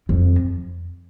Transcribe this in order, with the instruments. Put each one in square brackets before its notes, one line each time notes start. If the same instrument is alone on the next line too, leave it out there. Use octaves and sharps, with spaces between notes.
[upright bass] F2